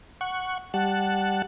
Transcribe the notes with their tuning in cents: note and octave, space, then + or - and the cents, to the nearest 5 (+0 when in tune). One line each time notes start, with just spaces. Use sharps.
F#5 +0 C#6 +0
G3 +0 F#5 +0 A5 +0